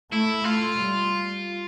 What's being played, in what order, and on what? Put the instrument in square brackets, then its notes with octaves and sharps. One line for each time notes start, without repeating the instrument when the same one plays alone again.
[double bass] A3 [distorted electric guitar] E4
[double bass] A3 [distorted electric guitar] F4
[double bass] G3